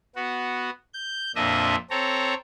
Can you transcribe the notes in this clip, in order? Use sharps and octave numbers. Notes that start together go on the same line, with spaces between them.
B3 F#4
G6
F2 A#2 D4 D#5 E5
C4 A4 C#5 A#5